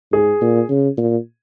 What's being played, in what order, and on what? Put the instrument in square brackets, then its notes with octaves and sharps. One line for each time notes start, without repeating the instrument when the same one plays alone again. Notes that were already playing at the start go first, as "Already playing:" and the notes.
[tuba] G#2 [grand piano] G#4
[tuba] A#2
C#3
A#2